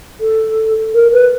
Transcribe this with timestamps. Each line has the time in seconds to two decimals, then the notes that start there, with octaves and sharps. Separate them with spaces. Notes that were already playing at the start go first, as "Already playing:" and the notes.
0.20 A4
0.95 A#4
1.13 B4